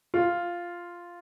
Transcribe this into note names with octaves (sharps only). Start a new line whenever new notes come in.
F4